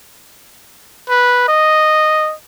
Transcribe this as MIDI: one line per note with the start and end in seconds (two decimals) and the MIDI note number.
1.09 1.44 71
1.48 2.34 75